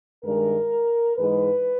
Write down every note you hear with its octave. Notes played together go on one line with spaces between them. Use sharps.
G2 D#3 G#3 A#4
G#2 E3 G#3 B4